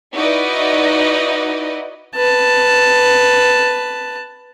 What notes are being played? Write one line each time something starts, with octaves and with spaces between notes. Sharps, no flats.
D#4 E4 F#4 B4 D5 D#5
B4 A5